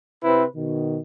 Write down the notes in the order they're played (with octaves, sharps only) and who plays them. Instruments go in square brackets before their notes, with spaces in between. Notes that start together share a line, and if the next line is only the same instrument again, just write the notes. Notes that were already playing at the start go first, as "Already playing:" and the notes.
[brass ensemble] C3 [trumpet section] C4 E4 B4
[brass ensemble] B2 D#3